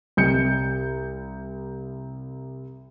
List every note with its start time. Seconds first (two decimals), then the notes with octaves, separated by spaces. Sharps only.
0.17 C2 G6 C#7